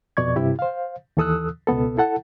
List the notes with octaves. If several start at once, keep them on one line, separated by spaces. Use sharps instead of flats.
F2 B2 D5 C#6 G#6
G2 C3 E4 G4
C5 F5
D#2 E3 A4 D#6 E6 F#6
C#2 B2 B3 A4
E4 A4 F#5 A5